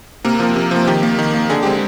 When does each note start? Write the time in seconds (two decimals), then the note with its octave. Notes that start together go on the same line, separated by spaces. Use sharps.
0.25 C3 A#3 A#4
0.40 F3 A#3
0.56 C3
0.71 F3 A#3
0.87 D#3 G4
1.03 A#3
1.19 D#3
1.34 A#3
1.50 D3 G#4
1.63 G#3 C4 G4